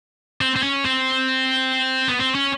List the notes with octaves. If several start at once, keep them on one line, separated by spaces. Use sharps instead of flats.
C4
C4
C#4
C4
B3
C4
C#4